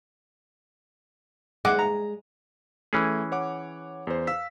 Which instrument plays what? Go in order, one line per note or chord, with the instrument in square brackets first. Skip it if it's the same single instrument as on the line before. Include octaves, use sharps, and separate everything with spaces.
[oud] G#3 [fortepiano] F#5 D6
[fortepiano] A#5
[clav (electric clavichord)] E3 C#4 G#4 [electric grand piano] A3
[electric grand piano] C#5 F#5 D6
E2 C5
F5 E6 B6